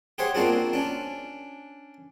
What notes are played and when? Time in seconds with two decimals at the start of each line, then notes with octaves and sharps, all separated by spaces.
0.18 G4 G#4 C5 C#5 F#5
0.35 A#3 C4 D4 F4 F#4
0.73 C#4 D4